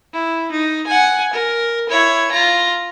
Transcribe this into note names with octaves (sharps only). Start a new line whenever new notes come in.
E4
D#4
F#5 G#5
A#4
E4 C#5
F4 A#5